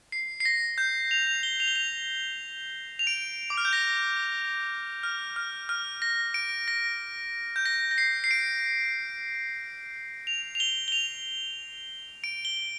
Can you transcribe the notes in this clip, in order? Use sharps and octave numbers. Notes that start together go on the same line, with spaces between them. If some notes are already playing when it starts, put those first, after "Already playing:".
C7
C7
A#6
G6
F7
F7
G7
F7
G7
F7
F7
D7
D6
F6
G6
A#6
F6
F6
F6
A#6
D7
A#6
G6
A#6
A#6
C7
C7
D7
F7
F7
G7
G7
F7
D7
G7